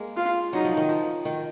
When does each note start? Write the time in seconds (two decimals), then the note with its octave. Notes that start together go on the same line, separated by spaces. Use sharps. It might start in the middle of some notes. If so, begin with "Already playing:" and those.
Already playing: G#3 A#3
0.17 F4
0.53 F#3 D#4
0.65 F3
0.77 D#3
0.89 F3
1.25 D#3